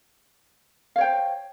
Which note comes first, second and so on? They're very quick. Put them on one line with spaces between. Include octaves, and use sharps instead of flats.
F5 C#5 G5 C5